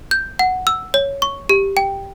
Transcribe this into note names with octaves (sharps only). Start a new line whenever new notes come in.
G6
F#5
E6
C#5
C#6
G4
G5